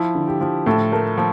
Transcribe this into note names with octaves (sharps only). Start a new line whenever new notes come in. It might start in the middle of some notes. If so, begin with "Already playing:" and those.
Already playing: F3 E4
D3
G4
F3
A2 A4
A3 A#4
F3